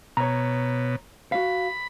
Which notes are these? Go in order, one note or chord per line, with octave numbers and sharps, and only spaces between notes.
B2 C#5 A#5
F#4 F5 B5